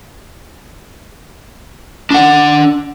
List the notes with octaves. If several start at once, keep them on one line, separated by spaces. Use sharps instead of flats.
D4 F#5